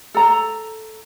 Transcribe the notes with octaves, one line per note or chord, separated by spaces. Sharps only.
A4 A#5